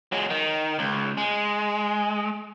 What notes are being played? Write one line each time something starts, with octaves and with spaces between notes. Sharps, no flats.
F#3 G#3
D#3
C#2
G#3